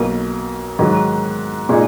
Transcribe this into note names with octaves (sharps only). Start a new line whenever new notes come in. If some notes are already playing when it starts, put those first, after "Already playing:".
Already playing: B1 B2 A#3
G#2 D#3 F#3
A#2 G#3 D#4